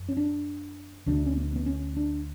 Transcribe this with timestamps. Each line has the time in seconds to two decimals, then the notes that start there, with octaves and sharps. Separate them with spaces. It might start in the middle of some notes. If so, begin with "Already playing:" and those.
Already playing: F#2
0.09 C#4
0.17 D4
1.06 D2 D3 D4
1.26 C#4
1.37 B3
1.56 B3
1.66 C#4
1.97 D4